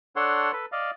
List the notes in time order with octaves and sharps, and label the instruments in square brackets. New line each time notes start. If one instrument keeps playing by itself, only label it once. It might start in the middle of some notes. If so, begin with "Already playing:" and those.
[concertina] D4 A4 C#5 F#5 C6
A4 B4
D5 D#5 F5